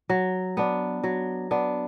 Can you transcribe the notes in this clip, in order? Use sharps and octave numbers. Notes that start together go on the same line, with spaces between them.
F#3
B3 D4
F#3
B3 D4